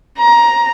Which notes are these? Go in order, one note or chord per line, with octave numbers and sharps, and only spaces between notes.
A#5